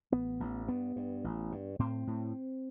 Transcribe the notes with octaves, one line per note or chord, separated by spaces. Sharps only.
A1 B3
A1
G2 B3
G2
A1
G2
A2 C4
A2